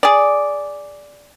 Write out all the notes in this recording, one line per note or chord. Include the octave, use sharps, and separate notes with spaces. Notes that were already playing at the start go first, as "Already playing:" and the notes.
G#4 D5